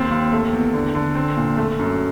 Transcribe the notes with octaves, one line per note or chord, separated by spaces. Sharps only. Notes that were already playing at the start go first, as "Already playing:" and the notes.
Already playing: D#2 C4
D#2
A3
E2
D3
D3
C4
A#2
A3
F#2